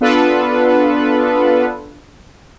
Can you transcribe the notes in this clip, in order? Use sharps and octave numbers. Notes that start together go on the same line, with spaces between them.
B3 D4 F4 A4 B4